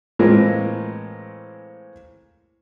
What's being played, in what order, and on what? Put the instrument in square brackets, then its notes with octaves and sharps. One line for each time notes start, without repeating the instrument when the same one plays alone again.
[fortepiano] A2 E3 G#3 A#3 C4 F4